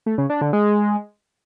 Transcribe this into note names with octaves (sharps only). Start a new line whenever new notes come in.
A3
C#3
D4
D3
G#3